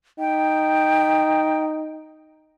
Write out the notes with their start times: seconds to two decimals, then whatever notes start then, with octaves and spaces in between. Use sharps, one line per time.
0.19 D#4 G5